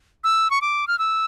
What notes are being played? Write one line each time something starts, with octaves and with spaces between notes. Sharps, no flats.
E6
C#6
D6
F6
E6